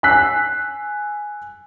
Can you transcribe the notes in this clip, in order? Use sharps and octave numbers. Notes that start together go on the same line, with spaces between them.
G#5 E6 F#6 B6 C7